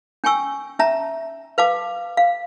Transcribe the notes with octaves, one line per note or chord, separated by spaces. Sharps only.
C#4 G5 G#5 C#6 E6
C#4 E5 A5 A#5
B4 F5 A5 D6
F5